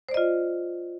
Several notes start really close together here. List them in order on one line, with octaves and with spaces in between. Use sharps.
C5 D5 D#5 F4